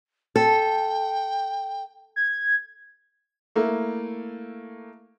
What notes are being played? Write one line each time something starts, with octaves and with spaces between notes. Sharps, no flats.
A4 G5
G#6
A3 A#3 E4